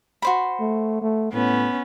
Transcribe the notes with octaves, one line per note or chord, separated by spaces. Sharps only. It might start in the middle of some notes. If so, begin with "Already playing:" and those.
F#4 C5 B5
A3
A3
A2 B3 C#4